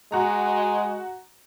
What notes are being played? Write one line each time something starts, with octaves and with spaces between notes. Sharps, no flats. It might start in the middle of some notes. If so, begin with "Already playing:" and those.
G#3 F#4 A#5